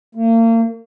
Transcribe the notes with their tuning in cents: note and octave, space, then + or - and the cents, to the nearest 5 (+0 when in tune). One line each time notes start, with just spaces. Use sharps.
A#3 -40